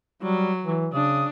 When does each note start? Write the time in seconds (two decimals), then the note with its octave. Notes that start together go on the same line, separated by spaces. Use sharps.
0.22 F#3 G3
0.64 E3
0.94 C#3 D4 D#6